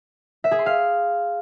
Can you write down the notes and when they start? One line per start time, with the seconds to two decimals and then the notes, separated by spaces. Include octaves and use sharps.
0.44 E5
0.51 G#4
0.59 C6
0.66 F5